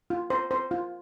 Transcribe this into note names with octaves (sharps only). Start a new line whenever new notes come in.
F4
C5
C5
F4